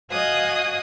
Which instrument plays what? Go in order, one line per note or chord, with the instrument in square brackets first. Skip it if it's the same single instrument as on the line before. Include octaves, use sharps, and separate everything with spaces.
[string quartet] F#4 D#5 F5 G#5 D#6 F#6